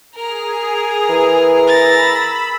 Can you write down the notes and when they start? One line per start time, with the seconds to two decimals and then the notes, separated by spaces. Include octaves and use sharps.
0.16 G#4 A#4 A#5
1.09 E3
1.66 B5 E6 A6 A#6